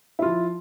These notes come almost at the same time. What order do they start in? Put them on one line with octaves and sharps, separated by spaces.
E4 F4 F3